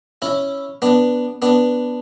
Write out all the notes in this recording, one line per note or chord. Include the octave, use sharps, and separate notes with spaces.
C#4 E4
B3 D4
B3 D4